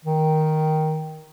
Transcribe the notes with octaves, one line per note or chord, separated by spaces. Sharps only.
D#3